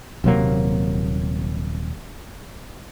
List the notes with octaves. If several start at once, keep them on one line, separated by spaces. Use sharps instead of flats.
D#1 C3 F#3 A#3